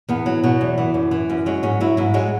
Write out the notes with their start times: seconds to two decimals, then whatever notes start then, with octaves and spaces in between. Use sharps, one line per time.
0.09 E2 B3
0.26 F#3
0.43 B2 F#3
0.61 E2
0.78 E3
0.94 F#2
1.11 E3
1.30 F#2
1.46 F#3 G#3
1.63 G#2 C#4
1.81 F#3 E4
1.97 G#2 E4
2.14 F#3 G#3